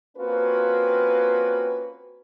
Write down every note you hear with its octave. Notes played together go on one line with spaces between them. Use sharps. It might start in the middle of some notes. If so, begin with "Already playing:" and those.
A#3 C4 C#4 F4 F#4 B4